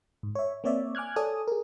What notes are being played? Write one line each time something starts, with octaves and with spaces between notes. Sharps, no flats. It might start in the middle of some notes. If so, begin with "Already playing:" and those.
G#2
C#5 E5
A#3 C4 C#5 D5 E5
G#5 D6 F6 F#6 G#6
A4 C#5 D5 G#5 D#6
G#4 A#4